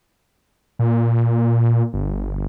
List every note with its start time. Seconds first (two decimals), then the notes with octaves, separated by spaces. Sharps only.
0.79 A#2
1.93 G1